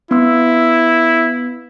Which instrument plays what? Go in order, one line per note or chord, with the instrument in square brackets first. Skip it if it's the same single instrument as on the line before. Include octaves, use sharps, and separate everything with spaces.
[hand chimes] B3 E6 [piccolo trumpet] E4